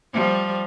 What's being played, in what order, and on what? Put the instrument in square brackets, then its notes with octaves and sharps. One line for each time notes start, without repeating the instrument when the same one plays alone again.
[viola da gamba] F3 G3